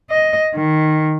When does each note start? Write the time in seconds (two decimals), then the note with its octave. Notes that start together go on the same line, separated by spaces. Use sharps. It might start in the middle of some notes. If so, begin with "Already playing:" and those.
0.11 D#5
0.55 D#3